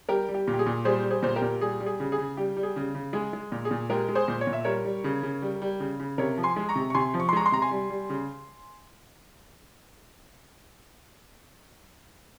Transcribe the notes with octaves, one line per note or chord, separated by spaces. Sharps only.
G3 G4 A#4
G3
G4
A#2
G4
G#4
A#2
G3 G#4 C5
G3
G#4 C5
A#2 C5
G4 A#4
A#2
G3 G#4
G3
G#4
C#3
G#4
C#3
G3 G4
G3
G#4
C#3
C#3
G#3 G#4
G#3
A#2
G#4
A#2
G#3 G4 A#4
G#3
G#4 C5
A#2
C#5
A#2
E5
G3 A#4 C#5
G3
C#3
C#3
G3
G3
C#3
C#3
C3 A#4 C#5
F3
G#5 C6
G#3
A#5 C#6
C3
C#6
C3 G#5 C6
F3
C#6
C6
G#3 A#5 C#6
C6
C3 A#5
G#5 C6
G3
G3
C#3